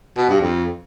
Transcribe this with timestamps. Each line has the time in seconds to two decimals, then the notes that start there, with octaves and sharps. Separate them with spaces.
0.17 B2
0.29 G2
0.41 F2